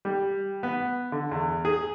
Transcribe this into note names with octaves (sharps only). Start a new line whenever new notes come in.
G3
B3
D3
E2
G#4